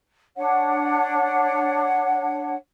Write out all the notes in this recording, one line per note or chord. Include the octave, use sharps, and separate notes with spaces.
D4 C#5 F#5